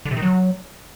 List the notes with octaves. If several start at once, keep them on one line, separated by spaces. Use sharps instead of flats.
D3
C3
D#3
F#3